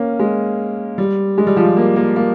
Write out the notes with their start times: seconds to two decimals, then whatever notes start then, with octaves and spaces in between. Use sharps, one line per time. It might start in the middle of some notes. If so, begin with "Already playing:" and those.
Already playing: A#3 C#4
0.19 G#3
0.98 G3
1.38 G#3
1.47 G3
1.57 F3
1.66 G3
1.77 A#3
1.96 A#3
2.16 A#3